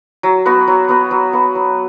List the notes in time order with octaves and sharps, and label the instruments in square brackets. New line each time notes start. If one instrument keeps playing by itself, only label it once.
[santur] F#3
B3 F#4 B4
F#3
B3 F#4 B4
F#3
B3 F#4 B4
F#3